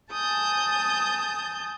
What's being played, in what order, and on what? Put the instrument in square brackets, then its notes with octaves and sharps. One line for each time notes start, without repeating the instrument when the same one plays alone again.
[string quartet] G#5 A5 D#6 G6 A6